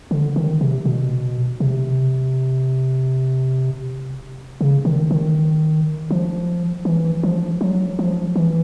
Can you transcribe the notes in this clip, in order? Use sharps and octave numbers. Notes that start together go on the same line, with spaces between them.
D3
D#3
C3
B2
C3
C#3
D#3
D#3
F3
E3
F3
F#3
F3
E3